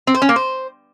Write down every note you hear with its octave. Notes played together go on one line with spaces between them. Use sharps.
C4
C5
C#4
A#3
C5